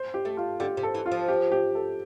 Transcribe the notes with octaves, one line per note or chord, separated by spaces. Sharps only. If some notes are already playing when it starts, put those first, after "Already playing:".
Already playing: C5
G4
A3
F4
D3 G4
C3
A4
E3
F4
F3
G4
G4
A4